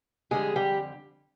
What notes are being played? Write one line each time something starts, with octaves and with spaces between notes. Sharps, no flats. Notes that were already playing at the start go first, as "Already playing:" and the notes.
F2 D3 G3 G#3 G#4
G3 G4